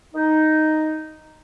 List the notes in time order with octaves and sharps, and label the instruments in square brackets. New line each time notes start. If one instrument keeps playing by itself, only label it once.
[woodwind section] D#4